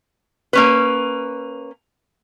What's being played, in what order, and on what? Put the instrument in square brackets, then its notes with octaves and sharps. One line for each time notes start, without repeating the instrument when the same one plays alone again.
[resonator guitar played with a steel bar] A#3 C#4 B4